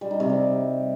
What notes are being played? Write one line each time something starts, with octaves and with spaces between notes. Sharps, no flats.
G3
D#4
C3
G3